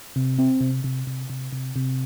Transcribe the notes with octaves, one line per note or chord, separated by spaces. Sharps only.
C3
C4
C3
C3
C3
C3
C3
C3